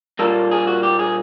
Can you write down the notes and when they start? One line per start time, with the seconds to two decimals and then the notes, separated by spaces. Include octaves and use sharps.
0.19 A#2 G3 A#3 A4
0.51 G#4
0.67 F#4
0.83 G4
0.99 G#4